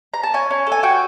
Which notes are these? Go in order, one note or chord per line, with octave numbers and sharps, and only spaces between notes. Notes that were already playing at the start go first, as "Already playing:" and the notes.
A#5
A5
C#4 G#5
C#4
A4
G#5
F#4 G5